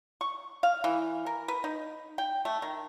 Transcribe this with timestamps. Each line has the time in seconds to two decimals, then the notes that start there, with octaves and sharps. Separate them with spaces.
0.21 C#6
0.63 F5
0.84 E3
1.26 A#4
1.48 B4
1.64 D#4
2.18 G5
2.45 A3
2.62 D#3